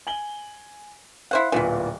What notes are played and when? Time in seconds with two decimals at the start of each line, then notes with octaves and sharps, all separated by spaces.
0.07 G#5 F#7 G7
1.31 E4 C5 F5 F#5
1.52 D1 A#2 E3 B3 F4